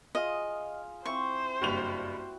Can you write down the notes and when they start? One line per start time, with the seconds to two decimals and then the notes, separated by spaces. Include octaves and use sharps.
0.15 F4 G#4 D#5 F5
1.05 C4 E4 C5 C#6
1.61 F#1 G2 F#4 G5 F7